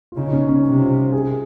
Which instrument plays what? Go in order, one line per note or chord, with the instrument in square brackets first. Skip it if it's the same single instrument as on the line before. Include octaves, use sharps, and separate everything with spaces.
[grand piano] F4
[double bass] C#3 [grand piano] D#4
[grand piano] C#4
C#4
[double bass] C3
[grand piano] F4
G#4